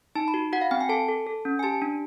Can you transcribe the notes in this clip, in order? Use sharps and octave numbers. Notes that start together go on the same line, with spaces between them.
D#4 A5
B5
F#4
F#4 F#5
F5
C4 G5
G#5
A4 A5
A4
A4
C#4
G#5
G4 A5
D4